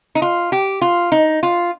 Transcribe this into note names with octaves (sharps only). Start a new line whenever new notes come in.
D#4
F4
G4
F4
D#4
F4